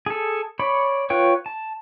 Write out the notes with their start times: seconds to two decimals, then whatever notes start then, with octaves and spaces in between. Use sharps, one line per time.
0.06 G#4 A4
0.59 C#5 D5 B5
1.10 F4 B4 C#5 G5
1.46 A5